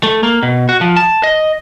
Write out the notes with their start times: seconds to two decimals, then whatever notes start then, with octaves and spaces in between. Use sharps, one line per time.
0.03 A3
0.23 A#3
0.43 B2
0.69 F#4
0.81 F3
0.97 A5
1.23 D#5